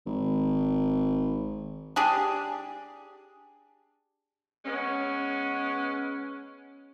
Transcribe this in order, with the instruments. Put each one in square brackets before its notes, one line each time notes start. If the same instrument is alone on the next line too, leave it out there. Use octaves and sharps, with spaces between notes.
[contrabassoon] G#1
[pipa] D4 G4 G#4
[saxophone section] G#3 B3 C#4